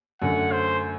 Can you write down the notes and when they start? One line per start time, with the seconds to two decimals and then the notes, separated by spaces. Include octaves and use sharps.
0.22 F#2 D3 A3 F#5
0.52 C5